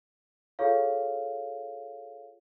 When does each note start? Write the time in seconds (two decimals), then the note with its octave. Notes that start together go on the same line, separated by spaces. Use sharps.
0.59 F4 G#4 A4 C#5 F5